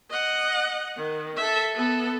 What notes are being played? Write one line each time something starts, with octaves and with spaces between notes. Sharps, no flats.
D#5 F#5
D#3
A4 E5
B3 A4